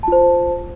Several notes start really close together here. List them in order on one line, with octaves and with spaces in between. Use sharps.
A5 F4 C5